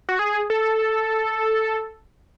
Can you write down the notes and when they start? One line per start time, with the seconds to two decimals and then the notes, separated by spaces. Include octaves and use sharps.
0.09 F#4
0.19 G#4
0.50 A4